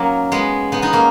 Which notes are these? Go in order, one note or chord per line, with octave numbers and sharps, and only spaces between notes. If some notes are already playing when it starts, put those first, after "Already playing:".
Already playing: F#3 A#3 C#4 D#4
G#3 B3
B3 D#4
B3 D#4
A#3 C#4